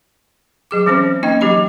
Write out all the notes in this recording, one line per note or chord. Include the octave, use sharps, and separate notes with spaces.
F#3 G#4 D6
E3 G3 C4 C#4 C5
A#3 C#4 D#4 D#5 G5
E3 F#3 G4 D#5 B5